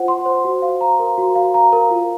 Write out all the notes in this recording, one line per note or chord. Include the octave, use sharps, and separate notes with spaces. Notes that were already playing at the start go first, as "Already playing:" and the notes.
Already playing: F4 C5 F#5
C6
C5
F#4
F5
A#5
A#4
F#4
F5
A#5
A#4
F4